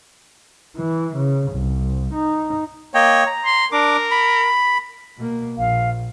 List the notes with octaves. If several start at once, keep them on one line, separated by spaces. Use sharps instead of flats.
E3
C#3
C2
D#4
A#3 C#5 D#5 G5
A#5
C6
D4 A#4 D6
B5
B2 A#3
A#1 F5